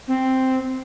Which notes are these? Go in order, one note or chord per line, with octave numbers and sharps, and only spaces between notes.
C4